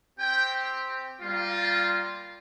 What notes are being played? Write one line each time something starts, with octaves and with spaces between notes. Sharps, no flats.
C4 G4 G5
G3 A#3 F4